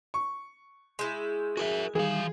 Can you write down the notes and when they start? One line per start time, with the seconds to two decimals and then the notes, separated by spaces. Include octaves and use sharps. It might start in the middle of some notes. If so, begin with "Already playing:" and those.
0.14 C#6
0.99 G#3 E4 C6 G6
1.57 F#4 G#4 A#4 E5
1.95 D#3 E3 G3 G#4 F5